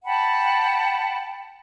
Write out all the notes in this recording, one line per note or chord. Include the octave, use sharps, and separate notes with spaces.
F#5 G5 A5 B5